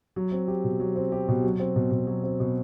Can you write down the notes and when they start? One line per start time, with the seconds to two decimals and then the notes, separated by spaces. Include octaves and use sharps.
0.16 F#3
0.32 C4
0.48 G4
0.64 B2
0.80 F#3
0.96 C4
1.12 G4
1.28 B2
1.44 F#3
1.60 C4
1.76 B2
1.91 B2
2.07 F#3
2.24 C4
2.40 B2